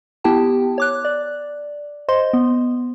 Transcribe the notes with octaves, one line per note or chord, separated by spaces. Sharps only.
B3 E4 G4 G5 A5
C#5 D6 F#6
D5
C5 D#5 C6
B3